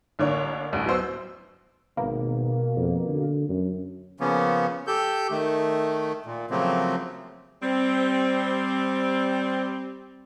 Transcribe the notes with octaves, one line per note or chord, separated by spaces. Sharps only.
A1 D3 A#3 D4 C#5
A1 D2 G2
F#3 B3 C5 E6
G#1 B2 A#3
F2
D3
F#2
C#3 F3 A#3 B3 C#4
G4 A4 G6
D#3 A3
A#2
C#3 F3 F#3 A3 A#3 C4
G3 C4